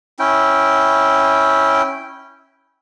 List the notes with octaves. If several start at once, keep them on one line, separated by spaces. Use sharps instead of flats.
C#4 E4 G5